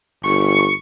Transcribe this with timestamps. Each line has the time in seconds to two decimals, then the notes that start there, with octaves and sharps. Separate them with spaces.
0.25 G1 C#6